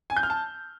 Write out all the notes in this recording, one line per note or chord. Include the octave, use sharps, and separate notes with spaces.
G#5
G6
F6
A5